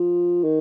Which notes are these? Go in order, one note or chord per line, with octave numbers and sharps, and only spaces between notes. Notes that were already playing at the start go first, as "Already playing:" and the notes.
Already playing: F3
D#3